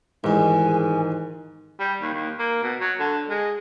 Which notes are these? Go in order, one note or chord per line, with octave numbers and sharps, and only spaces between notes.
A1 E2 G#2 D#3 G#5
G3
D#2
D#2
A#3
B2
F#3
D3
G#3